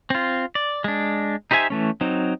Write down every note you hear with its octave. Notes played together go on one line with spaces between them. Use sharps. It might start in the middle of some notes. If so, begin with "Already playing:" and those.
C4 F4
D5
G#3 D4
D#4 G4 C5 E5 G#5
E3 A3 C#4
F#3 C4 D#4